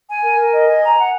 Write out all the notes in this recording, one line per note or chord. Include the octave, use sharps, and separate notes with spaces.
G#5
A#4
A#4
D#5
G#5
A#5
F#5